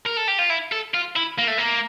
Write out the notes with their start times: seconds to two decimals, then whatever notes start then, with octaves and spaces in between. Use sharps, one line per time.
0.05 A#4
0.17 A4
0.28 G4
0.39 F4
0.50 E4
0.72 A4
0.94 F4
1.16 E4
1.38 A#3
1.47 A3
1.58 A#3